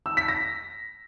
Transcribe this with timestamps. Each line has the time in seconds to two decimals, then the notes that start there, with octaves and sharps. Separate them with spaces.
0.06 E6
0.17 B6
0.28 A#6